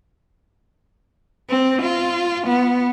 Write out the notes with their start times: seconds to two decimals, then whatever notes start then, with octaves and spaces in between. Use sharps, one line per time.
1.49 C4
1.82 F4
2.47 B3